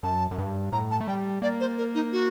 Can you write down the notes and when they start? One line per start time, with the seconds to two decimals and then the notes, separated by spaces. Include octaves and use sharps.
0.03 F#2 A5
0.31 F#2
0.38 G2
0.72 A2 A#5
0.91 A5
1.01 A3
1.07 G3 G5
1.42 A#3 D5
1.60 C5
1.78 A#4
1.95 D#4
2.12 F#4